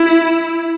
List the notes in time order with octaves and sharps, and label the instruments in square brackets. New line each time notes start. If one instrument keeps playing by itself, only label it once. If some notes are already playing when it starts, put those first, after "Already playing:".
Already playing: [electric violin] E4